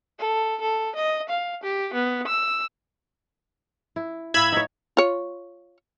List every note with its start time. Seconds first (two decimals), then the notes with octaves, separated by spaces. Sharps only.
0.19 A4
0.61 A4
0.96 D#5
1.29 F5
1.63 G4
1.94 B3
2.27 E6
3.96 E4
4.34 A2 F5 B5 E6 G#6
4.52 D#4 C#5
4.97 F4 C#5